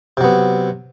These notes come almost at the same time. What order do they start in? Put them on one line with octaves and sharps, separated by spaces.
C3 F#3 B3